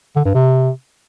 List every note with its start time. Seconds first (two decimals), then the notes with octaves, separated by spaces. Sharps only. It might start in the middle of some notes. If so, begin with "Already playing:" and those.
0.16 D3
0.25 G2
0.34 C3